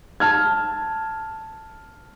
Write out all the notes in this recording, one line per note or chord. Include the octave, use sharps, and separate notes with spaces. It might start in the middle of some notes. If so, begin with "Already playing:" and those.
A5 F6 G#6